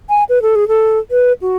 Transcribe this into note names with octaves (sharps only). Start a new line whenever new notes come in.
G#5
B4
A4
G#4
A4
B4
F#4